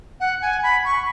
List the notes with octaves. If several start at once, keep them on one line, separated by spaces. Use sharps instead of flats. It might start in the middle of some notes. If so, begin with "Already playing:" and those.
F#5
G#5
B5
C#6